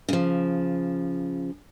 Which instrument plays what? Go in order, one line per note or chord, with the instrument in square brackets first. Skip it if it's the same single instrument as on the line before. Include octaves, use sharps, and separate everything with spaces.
[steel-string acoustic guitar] C#3 F3